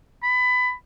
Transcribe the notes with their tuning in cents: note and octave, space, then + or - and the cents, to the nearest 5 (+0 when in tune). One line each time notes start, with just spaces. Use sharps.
B5 +20